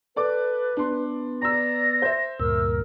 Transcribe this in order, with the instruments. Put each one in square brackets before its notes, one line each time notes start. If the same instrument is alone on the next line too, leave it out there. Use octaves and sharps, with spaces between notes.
[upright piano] A4 D5 D6 [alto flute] B4
[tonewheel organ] B3 [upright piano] D4 C6
[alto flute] D5 [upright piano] A#5 E6 [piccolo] A#6
[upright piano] C5 E5
[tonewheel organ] D2 G2 A#2 [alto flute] A#4 [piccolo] E6